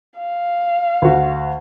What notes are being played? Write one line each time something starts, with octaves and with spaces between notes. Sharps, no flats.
F5
D2 F#4